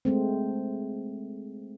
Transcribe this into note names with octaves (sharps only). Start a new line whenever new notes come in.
G#3 A3 C4